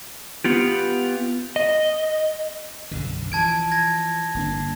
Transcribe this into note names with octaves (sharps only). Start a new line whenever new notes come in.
B3 F4 G4
D#5
B1 F#2 D3
E3 F3 A5 G#6 D7
G#6 A#6
G1 A#3 D4